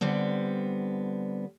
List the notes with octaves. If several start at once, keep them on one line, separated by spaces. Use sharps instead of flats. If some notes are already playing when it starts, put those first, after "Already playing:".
D3 G3 B3 C4